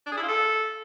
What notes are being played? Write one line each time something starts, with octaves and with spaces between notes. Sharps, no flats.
D4
G#4
E4
F4
A4